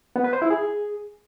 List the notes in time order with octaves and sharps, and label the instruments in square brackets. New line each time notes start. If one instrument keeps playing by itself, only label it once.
[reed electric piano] B3
B4
C5
E4
G#4